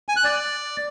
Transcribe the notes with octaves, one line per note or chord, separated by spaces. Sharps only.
G#5
F#6
D5